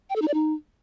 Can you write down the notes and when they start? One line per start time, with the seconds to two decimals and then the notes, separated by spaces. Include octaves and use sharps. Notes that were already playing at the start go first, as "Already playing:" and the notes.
0.10 G5
0.16 A4
0.22 D#4
0.28 D5
0.34 D#4